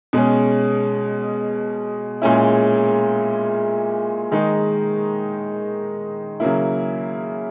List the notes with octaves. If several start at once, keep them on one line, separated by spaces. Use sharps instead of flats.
B2 G#3 C#4
A#2 G#3 C#4 E4
D#3 G#3 D#4
C#3 F#3 A#3 E4